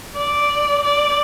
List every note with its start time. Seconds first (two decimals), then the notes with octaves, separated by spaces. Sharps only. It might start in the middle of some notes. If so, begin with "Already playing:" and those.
0.17 D5
0.84 D5